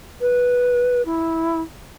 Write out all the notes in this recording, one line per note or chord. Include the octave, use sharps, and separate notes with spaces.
B4
E4